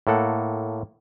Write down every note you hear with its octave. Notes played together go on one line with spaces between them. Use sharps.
A2 A#3 A4 F#5